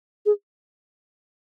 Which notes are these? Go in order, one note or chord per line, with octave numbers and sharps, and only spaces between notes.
G#4